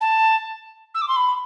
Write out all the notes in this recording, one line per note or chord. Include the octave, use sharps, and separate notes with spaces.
A5
E6
D6
C6
B5